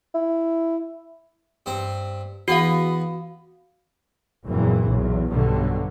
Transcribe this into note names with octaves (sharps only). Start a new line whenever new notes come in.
E4
G2 C4
E2 B3 F#4 B4 F5
F#1 E2 A#2 E3 A#3
B1 E2
B1 G2 B2 D3 F#3 G3